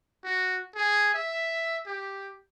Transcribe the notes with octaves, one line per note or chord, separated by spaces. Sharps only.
F#4
G#4
E5
G4